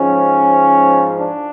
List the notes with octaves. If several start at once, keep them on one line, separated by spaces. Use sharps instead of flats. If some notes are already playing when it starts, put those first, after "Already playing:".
Already playing: G#2 F3 C#4
D4